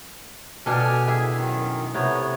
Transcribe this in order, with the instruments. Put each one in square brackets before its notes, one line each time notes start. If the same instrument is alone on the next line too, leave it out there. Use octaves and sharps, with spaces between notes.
[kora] B2 D4 A4 [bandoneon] G4 G#5 F6
[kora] E4 G#4 E5 [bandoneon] G#5
[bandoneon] F#2 D#3
[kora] C3 [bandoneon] A3 B3 C#5